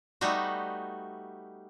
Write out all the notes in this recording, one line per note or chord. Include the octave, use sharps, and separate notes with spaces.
G3 A3 B3 D#4 F#4